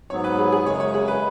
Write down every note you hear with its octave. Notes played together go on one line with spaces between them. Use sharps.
G#2 F#3 B3 C#5
B4
G#4
G#4
F#2 C#3 G#3 C#5
C#5
G#4
B4